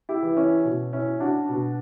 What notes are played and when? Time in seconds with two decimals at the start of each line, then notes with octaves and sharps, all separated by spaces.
0.09 E4 G4
0.23 E3
0.37 C#4 E4
0.65 B2
0.93 C#4 E4
1.20 D4 F#4
1.49 B2